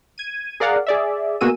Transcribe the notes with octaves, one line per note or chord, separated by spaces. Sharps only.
G#6 D#7
G#4 A#4 D5 F5 F#5
G#4 D5 E5
B2 A#3 F#4 G#4 E6 D#7